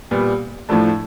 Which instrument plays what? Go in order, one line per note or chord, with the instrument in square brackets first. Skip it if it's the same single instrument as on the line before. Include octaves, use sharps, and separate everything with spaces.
[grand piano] A#2 G3 B3
A2 F3 A3 D4